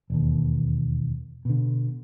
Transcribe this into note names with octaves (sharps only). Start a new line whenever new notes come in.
E1 D#2
B2 D3